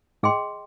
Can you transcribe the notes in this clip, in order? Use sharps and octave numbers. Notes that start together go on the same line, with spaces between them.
G#2 G#4 D#5 G5 C6